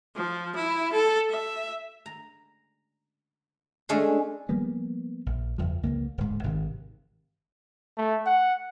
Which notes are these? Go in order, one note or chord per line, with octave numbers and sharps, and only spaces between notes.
F3
E4
A4
E5
A#5
G#3 A3 C#4 D4 G#4
F3 G3 A#3 B3
A#1
F#1 E2 F3
C#2 A#3
D1 G#2
G#1 C3 D#3
A3
F#5